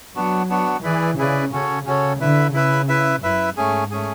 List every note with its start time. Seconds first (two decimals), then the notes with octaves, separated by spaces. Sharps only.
0.15 F#3 B3 D4 F#4
0.50 B3 D4 F#4
0.83 E3 E4 G#4 B4 D5
1.18 C#3 E4 G#4 B4 D5
1.52 C#3 C#4 F#4 A4 C#5
1.86 C#3 C#4 F#4 A4 C#5
2.20 D3 E4 B4 E5
2.54 C#3 E4 B4 E5
2.88 E4 B4 E5
3.23 F#2 E4 B4 E5
3.57 G#2 A3 C#4 G#4
3.91 A3 C#4 G#4